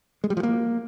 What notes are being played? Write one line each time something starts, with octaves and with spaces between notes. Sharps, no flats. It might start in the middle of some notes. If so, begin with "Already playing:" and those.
G#3
G3
F3
A#3